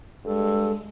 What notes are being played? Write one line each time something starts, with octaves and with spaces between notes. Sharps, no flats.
G2 G#3 A4